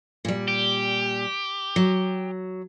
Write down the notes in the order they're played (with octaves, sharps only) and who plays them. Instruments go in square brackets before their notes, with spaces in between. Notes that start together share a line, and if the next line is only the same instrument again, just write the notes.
[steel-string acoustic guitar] A#2 G3
[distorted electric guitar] G4
[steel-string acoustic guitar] F#3